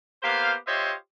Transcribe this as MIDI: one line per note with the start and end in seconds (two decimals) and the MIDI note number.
0.23 0.54 58
0.23 0.54 59
0.23 0.54 67
0.23 0.54 72
0.23 0.54 77
0.67 0.93 65
0.67 0.93 67
0.67 0.93 72
0.67 0.93 73
0.67 0.93 75
0.67 0.93 76